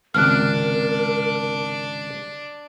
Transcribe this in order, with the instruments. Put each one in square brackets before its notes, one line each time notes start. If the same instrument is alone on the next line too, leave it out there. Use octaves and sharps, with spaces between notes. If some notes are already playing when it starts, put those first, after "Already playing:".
[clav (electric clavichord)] G#1 C#2 C3 [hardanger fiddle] D4 [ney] A#4 [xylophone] F6 F#6